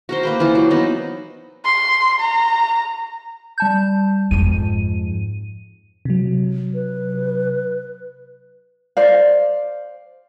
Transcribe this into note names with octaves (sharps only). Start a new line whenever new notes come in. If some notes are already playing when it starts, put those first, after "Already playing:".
F#4 A#4 C5
A#3 B4 G5
E3 F4 C5
F#3
B3 D#4
C6
A#5
G3 A5 G6
F2 G#2 D#7
C3 F#3
B4
C5 D5 F5